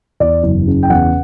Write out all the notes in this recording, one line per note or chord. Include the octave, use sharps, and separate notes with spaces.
E2 D5
F#1
C#3
G5
E2 F#5